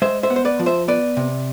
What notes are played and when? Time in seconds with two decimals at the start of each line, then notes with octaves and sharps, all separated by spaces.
0.02 G#3 C5 E5
0.23 C5 E5
0.30 B3
0.36 C5
0.45 B4 D5
0.59 F3
0.66 C5 E5
0.88 B3 B4 D5
1.17 C3